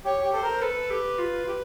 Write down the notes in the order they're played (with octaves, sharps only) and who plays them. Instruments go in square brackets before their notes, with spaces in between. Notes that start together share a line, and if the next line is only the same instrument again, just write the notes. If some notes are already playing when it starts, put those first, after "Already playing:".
[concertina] G4 [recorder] C#5
[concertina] G4
[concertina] A4 [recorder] C5
[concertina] A#4
[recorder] A4 [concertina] B4
[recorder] G4
F4
G4